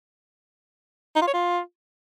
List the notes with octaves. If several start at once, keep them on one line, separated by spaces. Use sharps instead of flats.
D#4
F4
C#5
F4